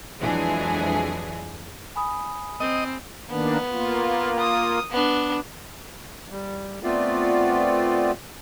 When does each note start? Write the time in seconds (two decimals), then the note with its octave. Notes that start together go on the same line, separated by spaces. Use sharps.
0.20 F2 E3 F#3 G#3 D4 G#4
1.96 G#5 B5 D#6
2.60 C4 D#5
3.30 D#3 A#3 B3 D4
3.71 A#3 F4
4.40 D#6
4.91 B3 D4
6.30 G3
6.83 A3 B3 C4 F4 D5